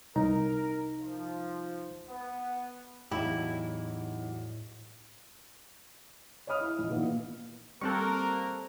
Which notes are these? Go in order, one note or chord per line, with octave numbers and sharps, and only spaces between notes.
C2 D#4 A#4 A#5
F3
B3
E2 A2 F#3 D#4 E4 G4 F5 A5
C#5 D#5 B5 D#6 F6
E4
A#1 D#5
A#2 D#3 E3 A#3 B3
G3 A#3 C4 A4 A#4 C#6 F#6